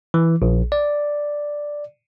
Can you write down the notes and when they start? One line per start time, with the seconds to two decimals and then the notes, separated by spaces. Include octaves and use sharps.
0.14 E3
0.42 A#1
0.72 D5